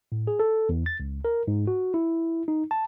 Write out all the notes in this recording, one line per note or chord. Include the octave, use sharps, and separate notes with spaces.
A2
G#4
A4
E2
A6
C#2
A#4
G#2
F#4
E4
D#4
A5